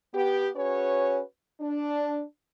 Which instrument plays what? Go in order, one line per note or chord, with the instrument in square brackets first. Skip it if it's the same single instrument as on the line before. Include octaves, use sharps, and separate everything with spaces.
[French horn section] B3 G4
C#4 F#4 G#4 B4 C#5
D4